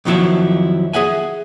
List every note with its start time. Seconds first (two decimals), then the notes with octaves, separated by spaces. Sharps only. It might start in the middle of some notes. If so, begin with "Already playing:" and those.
0.05 F2 D#3 F3 F#3 E4 A5
0.93 G#4 E5 F#5 G#5